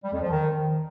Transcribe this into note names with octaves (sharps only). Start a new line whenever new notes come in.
G3
F2
F3
D#3